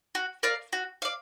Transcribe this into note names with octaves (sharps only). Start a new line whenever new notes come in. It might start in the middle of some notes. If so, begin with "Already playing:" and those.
F#4
A#4 D5 F5
F#4
D5 F5